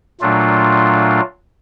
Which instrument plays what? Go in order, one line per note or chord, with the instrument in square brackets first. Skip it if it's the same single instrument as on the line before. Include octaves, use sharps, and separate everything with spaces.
[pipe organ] A#2 F#3 A3 D4 F4